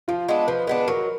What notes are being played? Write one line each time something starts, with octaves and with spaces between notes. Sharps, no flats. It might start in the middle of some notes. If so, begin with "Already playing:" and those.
F3 F4
G#3 B3 D4
F3 B4
G#3 B3 D4 B4
F#3 A#4